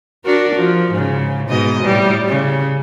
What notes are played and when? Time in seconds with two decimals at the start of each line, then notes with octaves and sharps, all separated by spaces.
0.24 D4 F#4 A#4
0.55 F3
0.91 G#2 C#3
1.48 G#2 B2 D#5
1.83 A2 G3
2.28 C#3